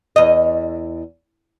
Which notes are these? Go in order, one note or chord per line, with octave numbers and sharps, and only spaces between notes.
E2 D#5